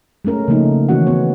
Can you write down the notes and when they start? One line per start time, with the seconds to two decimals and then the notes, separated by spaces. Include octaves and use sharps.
0.25 G#3 A3 C#4 A#4
0.48 C#3 F3 A3 A#3 D#4
0.89 D#3 E3 C#4 F#4 F#5
1.07 B3 C#5